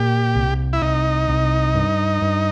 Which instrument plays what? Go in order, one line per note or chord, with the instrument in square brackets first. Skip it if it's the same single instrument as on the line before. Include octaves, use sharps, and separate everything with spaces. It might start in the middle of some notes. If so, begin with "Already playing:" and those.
Already playing: [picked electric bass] A#2 [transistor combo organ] G4
[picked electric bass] C2
[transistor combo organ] E4
[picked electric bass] C2 [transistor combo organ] D#4
[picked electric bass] C2
G2
G2